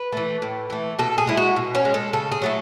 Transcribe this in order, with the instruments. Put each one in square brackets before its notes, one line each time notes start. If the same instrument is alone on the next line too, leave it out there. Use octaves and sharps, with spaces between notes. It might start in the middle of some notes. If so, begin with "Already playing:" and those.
Already playing: [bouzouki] B4
E3 A3
A2
E3 A3
B2 A4
G#4
G#3 E4
F#4
B2
C#4
G#3
A4
C#3 A4
G#4
F#3 A3 E4